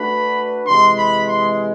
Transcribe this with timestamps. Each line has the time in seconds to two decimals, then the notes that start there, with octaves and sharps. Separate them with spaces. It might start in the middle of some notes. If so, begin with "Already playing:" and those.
Already playing: A3 D4 F#4 B4 B5
0.67 C3 E3 G#3 C6
0.98 B5
1.28 C6